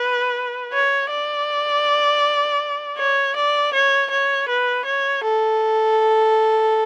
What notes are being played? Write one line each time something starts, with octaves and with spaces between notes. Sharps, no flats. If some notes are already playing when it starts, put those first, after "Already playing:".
Already playing: B4
C#5
D5
C#5
D5
C#5
C#5
B4
C#5
A4